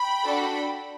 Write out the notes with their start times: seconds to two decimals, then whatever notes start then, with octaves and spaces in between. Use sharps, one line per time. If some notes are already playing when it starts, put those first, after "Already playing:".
Already playing: G5 B5
0.23 D4 F#4 A4